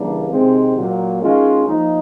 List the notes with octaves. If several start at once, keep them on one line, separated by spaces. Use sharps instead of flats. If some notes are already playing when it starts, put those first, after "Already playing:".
Already playing: C#3 E3 G3 A#3 D4
C3 D#3 G#3 C4
A#2 F#3 A#3
D#3 G#3 C#4 F4
F3 A#3 D#4